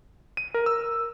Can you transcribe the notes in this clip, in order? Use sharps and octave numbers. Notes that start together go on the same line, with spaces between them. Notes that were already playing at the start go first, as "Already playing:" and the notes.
D#7
A#4
E6